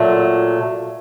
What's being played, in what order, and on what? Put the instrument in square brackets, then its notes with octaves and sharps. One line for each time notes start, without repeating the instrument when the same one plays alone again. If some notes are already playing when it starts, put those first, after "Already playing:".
Already playing: [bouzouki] A#2 F#3 A3